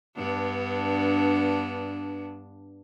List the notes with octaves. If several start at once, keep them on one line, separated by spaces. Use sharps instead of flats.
G2 B3 D4